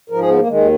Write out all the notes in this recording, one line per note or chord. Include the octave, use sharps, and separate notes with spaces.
G#2 F3 A#4
G#4
B3
A#3
D#2 D#3 G#3